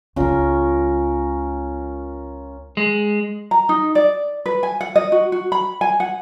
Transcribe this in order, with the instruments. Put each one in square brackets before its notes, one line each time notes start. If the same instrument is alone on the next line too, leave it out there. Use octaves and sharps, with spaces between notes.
[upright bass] C#2 G#3 [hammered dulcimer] C#4 F4 A#4
[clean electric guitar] G#3
[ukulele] A#5
D#4
D5
B4
G#5
F#5
D#5
F#4
F#4
B5
G#5
F#5